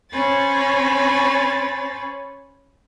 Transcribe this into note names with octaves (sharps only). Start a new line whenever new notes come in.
C#4 C5 C#5 G#5 B5 A6